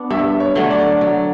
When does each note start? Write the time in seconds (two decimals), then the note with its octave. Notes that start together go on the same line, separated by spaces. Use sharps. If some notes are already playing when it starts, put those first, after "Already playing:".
Already playing: B3 D4
0.10 G2 E5
0.40 C#5
0.55 D3 F#3 A3
0.71 D5
1.01 F#3